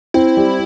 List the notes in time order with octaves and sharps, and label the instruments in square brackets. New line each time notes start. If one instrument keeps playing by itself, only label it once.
[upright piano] C4 [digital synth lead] E4
[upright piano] G3